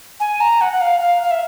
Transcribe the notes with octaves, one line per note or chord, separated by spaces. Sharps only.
G#5
A#5
F#5
F#5
F5
F5
F5
E5